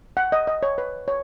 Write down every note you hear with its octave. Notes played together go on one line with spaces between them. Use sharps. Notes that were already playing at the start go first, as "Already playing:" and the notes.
F#5
D#5
D#5
C#5
B4
C#5